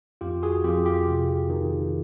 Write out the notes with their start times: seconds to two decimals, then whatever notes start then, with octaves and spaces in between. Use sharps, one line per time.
0.21 F2 F4 G4
0.42 F#4 G#4
0.64 F2 F4 G4
0.86 F4 G4
1.07 C3
1.50 D#3